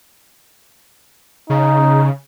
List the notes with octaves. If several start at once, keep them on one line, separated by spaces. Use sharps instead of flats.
C#3 D#4